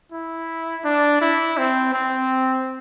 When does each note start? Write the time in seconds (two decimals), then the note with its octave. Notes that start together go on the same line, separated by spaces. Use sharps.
0.12 E4
0.85 D4
1.21 E4
1.58 C4
1.94 C4